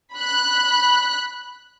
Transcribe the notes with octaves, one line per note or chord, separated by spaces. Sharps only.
B5 F#6